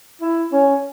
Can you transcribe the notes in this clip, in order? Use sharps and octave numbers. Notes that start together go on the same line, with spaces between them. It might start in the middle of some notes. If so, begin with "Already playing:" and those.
E4
C#4